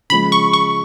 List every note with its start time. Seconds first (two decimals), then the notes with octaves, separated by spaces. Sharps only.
0.10 C#3 F3 G#3 B5
0.32 C#6
0.53 C#6